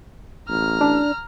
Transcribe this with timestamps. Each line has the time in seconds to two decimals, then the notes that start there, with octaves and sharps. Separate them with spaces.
0.49 A1 A#5 F6
0.81 D4